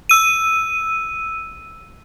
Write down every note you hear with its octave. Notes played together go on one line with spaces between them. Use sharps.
E6 D#7